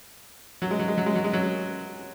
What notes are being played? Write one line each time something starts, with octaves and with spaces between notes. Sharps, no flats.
F#3
G#3
F#3
G#3
F#3
G#3
F#3
G#3
F#3